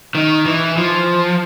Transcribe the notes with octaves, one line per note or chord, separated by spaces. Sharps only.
D#3
E3
F3